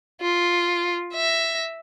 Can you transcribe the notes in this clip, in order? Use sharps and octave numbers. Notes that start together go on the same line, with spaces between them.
F4
E5 A#6